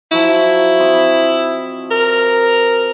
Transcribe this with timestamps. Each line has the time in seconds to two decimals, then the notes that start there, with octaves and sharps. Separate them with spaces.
0.11 F3 F#3 E4 F#4
0.79 C4 D#5 B5
1.91 A#4